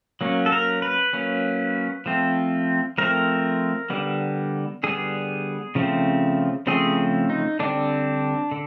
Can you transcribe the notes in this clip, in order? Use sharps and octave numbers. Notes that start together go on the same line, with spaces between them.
F#3 A#3 C#4
A4
A#4
B4
F#3 A#3 C#4
F3 A3 C4
F3 A3 C4 A#4
D3 G3 B3
D3 G3 B3 G#4
C#3 F3 A3 C4
C#3 F3 A3 C4 G#4
D#4
D3 G3 C4 D4
D3